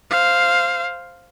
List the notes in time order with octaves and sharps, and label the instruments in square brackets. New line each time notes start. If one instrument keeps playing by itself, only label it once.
[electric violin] C5 F5